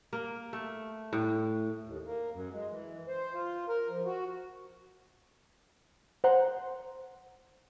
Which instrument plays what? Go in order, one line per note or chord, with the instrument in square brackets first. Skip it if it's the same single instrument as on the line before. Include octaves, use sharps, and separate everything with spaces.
[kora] A#3
A3
A2
[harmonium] D#2
A#3
F#2
G#3
E3
C5
F4
A#4
F3
F#4
[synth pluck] C5 F#5 A#5 C6